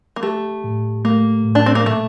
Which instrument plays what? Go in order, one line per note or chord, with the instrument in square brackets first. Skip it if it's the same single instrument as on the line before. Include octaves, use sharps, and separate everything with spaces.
[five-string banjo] A#3
[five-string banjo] A3 [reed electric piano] G4
[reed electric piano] A2
[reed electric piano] A3 [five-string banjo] A#3
[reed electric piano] A2
[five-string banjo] D4
C4
A#3
[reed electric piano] A#2 [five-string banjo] A3